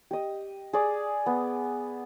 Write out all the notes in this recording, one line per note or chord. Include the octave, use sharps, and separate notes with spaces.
G4 D#5
G#4 D5
B3